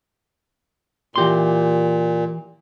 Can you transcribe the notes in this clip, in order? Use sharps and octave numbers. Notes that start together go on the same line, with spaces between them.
A#2 E3 G4 C6